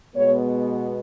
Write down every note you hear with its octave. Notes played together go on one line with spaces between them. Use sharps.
B2 G#3 B3 C#5